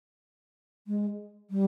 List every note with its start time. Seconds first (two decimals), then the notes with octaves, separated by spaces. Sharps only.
0.87 G#3
1.50 G3